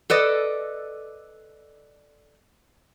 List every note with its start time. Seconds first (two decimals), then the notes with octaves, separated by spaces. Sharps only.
0.10 A4 B4 D5 D#5